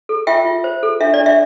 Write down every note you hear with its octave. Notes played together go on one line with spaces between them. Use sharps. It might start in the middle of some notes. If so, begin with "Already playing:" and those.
A4
F4 E5 G5
F4
C5
A4
D4 E5
D5
D4
E5